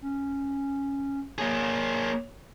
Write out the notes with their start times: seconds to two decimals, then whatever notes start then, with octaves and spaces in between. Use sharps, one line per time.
0.02 C#4
1.38 A#3 G#4 C#5